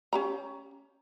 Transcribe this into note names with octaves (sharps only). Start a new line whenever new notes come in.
C#4 G4 A#5